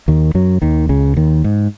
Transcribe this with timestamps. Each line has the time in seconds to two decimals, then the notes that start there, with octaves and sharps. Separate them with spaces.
0.08 D#2 D#3
0.35 F#2 F#3
0.62 D#2 D#3
0.89 C#2 C#3
1.16 D#2 D#3
1.44 G#2